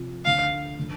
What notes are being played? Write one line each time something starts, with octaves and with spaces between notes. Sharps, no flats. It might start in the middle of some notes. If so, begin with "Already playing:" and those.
Already playing: C3 F3 C4 F4
D2 D3 A3 F5
D3 F3